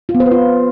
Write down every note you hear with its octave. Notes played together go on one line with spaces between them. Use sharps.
F4
B3
C5
B4
F4